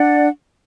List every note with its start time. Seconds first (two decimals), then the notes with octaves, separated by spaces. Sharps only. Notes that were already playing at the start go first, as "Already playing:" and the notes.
Already playing: D4 D5 F#5